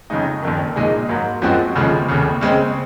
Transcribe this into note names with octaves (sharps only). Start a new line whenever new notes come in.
F2 C#3 G#3 D#4
F#1 F2 D#3
A#1 A#2 G#3 D#4 G#4
G#2 F#3 A#3
F#2 F3 G#3 C4 F#4
F1 D#2 C#3 F3 G#3
F1 D#2 C#3
C#3 G#3 C4